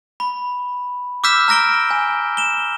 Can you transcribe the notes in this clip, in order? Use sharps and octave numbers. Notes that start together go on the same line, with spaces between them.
B5
D6 E6 F6 G6 B6 E7
A#5 F6 A#6 D7 G7
G#5
E7 G7